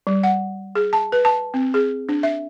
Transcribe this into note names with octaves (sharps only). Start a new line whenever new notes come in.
G3
F#5
G#4
A5
B4
A5
C4
G#4
D4
E5